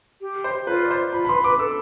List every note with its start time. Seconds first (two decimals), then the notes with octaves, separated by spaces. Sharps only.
0.21 G4
0.44 C5
0.67 F4 B4
0.84 D5
0.91 C5
1.13 F4 B5
1.25 B5
1.29 B4 C6
1.44 B4 D6
1.59 A4 E6